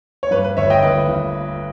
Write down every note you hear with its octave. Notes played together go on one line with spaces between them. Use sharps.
C#5
G2 B4
B4
G1 C#5 E5
D#5 G5
G1 B4 D#5
G1